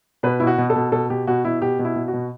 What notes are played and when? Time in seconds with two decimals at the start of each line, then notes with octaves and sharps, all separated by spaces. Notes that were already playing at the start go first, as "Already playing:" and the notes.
0.23 B2 B4
0.40 B2 E4
0.47 F#4
0.58 B2
0.70 A4
0.76 B2
0.92 B2 A4
1.10 B2 G4
1.27 B2 F#4
1.45 B2 E4
1.62 B2 G4
1.79 B2
1.85 E4
1.96 B2
2.08 F#4
2.13 B2